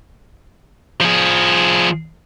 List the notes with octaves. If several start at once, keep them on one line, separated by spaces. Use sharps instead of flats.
F3 G#4